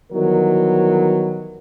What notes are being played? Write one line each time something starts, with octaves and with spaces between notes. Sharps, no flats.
D#3 E3 F#3 G3 B3 A#4